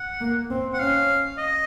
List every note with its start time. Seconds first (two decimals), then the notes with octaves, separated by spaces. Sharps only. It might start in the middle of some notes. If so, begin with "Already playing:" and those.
Already playing: F#5
0.21 A#3
0.50 C4
0.74 F#5
0.80 C#4 F5
1.38 D#5